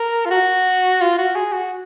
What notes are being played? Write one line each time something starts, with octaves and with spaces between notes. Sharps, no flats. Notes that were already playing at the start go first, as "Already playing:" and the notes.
Already playing: A#4
F4
F#4
F4
F#4
G#4
F#4